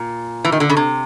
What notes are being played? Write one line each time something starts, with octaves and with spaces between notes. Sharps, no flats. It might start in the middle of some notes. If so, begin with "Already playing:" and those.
Already playing: A#2
E3
D#3
D3
C#3
C3